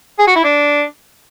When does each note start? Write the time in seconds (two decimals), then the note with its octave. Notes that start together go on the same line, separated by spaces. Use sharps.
0.19 G#4
0.27 F#4
0.36 E4
0.44 D4